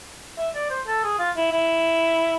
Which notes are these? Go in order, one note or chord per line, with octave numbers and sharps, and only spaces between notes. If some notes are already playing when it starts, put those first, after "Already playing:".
E5
D5
C5
A4
G#4
F4
E4
E4